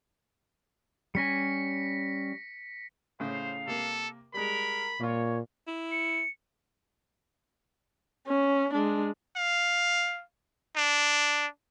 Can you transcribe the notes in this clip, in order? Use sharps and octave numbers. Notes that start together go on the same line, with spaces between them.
G3 C#4 G#5 A#6 B6 C#7
A2 C#3 C5 F5
C3 A#3 A4
G3 G#3 A#4 B5
A#2 A#3 F4 C#5
E4
C#7
C#4
G#3 D4
F5
D4